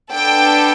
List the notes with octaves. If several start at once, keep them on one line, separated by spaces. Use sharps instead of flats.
B3 D4 A4 G5